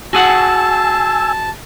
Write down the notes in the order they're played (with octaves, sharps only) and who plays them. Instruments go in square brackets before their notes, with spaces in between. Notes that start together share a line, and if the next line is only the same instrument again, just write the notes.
[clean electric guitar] F#4 G#4 F#5 [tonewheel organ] G#5 E6 [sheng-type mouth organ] A5